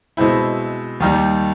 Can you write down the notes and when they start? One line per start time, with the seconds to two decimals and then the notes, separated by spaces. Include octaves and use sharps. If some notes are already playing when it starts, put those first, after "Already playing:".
0.17 B2 G#3 C4 E4
1.00 D#2 D#3 G3